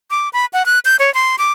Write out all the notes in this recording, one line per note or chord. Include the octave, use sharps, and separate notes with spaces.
D6
B5
F#5
F#6
G6
C#5
C6
D6